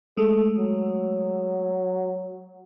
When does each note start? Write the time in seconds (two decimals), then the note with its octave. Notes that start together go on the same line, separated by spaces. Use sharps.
0.17 G#3 A3 A4
0.59 F#3